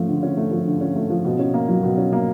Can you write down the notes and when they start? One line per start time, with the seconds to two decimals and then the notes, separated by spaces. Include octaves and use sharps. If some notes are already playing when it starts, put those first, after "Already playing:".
Already playing: F3 A3 C#4
0.08 D3
0.23 C#4
0.37 A3
0.51 F3
0.66 D3
0.81 C#4
0.96 A3
1.10 F3
1.25 B2
1.39 C#4
1.54 A#3
1.68 F#3
1.83 B2
1.98 C#4
2.12 A#3